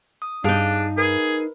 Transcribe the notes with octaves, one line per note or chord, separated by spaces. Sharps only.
D#6
G2 D4 D#4 G#4 F5 A5
G#4 A#4 B4